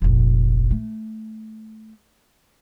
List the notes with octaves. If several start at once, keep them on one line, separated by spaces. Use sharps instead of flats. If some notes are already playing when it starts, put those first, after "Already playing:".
F1 A#1
A3